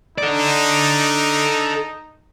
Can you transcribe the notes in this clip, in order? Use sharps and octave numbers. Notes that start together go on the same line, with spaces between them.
D#4 A4 D5